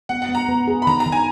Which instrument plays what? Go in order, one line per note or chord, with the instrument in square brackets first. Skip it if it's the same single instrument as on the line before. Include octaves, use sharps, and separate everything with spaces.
[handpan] B3 [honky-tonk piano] F#5
[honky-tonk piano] F#5
[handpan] B3
[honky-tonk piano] A#5
[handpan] B3
G#4
[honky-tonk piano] B5
[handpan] D#3 [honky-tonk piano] A#5
[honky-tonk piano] A#5
[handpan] D#3
[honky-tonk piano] G#5